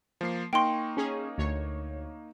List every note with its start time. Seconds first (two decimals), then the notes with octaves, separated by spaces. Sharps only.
0.21 F3 A#3 C7
0.53 A#3 D#4 G5 C6 C#6
0.97 C#4 G#4
1.38 D2 C#5